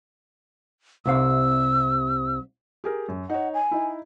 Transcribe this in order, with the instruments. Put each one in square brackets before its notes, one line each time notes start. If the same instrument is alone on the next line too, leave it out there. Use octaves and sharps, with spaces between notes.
[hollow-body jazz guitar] C2 C3 F5 [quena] E6
[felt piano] G4 G#4 A#4
F#2
[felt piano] D#4 C#5 [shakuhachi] F#5
[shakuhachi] G#5
[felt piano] D#4 E4